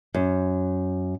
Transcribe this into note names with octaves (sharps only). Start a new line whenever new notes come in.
F#2